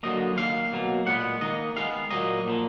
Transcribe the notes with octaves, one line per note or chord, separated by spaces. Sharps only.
D3 F#3 A#3 D#5
D#3 A#3 F5
B2 F#3 A#3
A#2 G#3 B3 F#5
D#3 A#3 D#5
D#3 G#3 B3 F5
A#2 F#3 A#3 D#5
A#2 F3 A#3